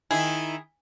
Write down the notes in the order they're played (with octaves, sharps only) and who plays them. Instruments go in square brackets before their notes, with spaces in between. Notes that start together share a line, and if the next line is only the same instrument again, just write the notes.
[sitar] D#3 D#4 E4 [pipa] G#4